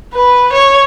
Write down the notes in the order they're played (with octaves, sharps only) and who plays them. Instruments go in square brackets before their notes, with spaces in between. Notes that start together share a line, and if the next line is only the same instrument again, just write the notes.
[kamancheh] B4
C#5